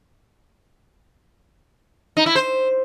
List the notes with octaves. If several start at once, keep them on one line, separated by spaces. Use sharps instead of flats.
D#4
E4
C5